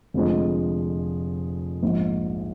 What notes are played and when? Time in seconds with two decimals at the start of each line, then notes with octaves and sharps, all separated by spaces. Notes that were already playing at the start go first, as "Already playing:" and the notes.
0.14 F1 F2 D3 F3 G#3
1.83 A#1 G#2 F3